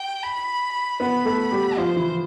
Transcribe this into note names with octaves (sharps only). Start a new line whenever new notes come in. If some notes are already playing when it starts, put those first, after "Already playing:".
Already playing: G5
B5
B3 B4 B5
A3 A4
G3 G4
F3 F4 C5
E3 E4